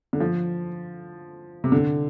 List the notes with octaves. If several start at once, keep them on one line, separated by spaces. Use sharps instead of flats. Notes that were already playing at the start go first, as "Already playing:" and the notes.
D3
F3
C3
D3